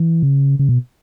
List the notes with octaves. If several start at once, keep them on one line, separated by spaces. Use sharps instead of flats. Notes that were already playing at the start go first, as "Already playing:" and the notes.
Already playing: E3
C#3
C#3
B2